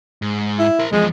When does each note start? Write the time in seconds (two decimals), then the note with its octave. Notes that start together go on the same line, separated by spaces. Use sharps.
0.22 G#2
0.59 E4
0.79 A#4 C5
0.92 E2 F3 G#3